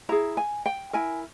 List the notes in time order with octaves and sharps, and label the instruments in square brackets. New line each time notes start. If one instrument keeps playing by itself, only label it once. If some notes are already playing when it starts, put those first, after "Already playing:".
[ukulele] E4 G#4 A#5
G#5
G5
E4 A#4 G#5